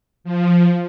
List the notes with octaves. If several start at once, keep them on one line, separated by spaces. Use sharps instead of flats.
F3